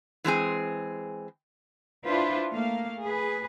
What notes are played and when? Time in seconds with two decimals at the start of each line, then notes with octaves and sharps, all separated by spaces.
0.24 E3 G#3 C4 G#4
2.06 D4 E4 F4 B4 C5
2.53 A3 A#3 F5
3.03 G#4 B4